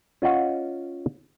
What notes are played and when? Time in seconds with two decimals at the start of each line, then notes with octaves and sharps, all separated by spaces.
0.22 C#4 F4 D#5 F#5